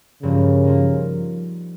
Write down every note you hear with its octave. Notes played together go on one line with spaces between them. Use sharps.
G2 C#3 F3 A#3
F3 A#3 D#4